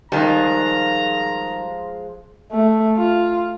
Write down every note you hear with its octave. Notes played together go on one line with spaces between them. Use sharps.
D#3 F3 G3 G#3 A#5
A3
F4